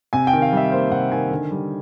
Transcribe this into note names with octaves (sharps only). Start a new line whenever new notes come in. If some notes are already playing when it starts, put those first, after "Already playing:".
C3 G#5
G5
D#3
F5
G3 E5
A#3 C5
C3 F#5
D#3 G#5
D3
G3